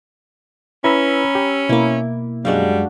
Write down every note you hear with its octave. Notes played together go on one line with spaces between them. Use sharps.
C#4 E4 B4 A#5 B5 E6
G4
B2 A#3 E4 D6
F#2 G3 G#3 D4 F#4 F5